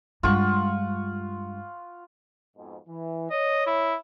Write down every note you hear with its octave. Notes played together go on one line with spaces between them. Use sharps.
G2 G#3 F4 F#5 C#6
F2 G#2 B2
E3
C#5 D#5
E4